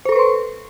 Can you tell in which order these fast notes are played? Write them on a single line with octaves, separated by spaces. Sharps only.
C5 A4 C#6 B4 C6